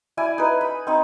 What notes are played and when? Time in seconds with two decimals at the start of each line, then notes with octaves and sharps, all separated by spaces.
0.17 E4 D5 G#5
0.38 D#4 B4
0.61 B5
0.87 C4 D#4